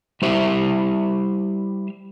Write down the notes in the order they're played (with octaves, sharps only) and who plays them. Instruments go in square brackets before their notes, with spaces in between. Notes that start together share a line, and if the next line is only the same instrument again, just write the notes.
[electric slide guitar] G3 E4 G4 C5 E5